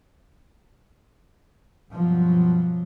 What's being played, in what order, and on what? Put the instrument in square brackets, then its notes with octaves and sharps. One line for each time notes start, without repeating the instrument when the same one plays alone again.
[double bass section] G2 B2 F3 F#3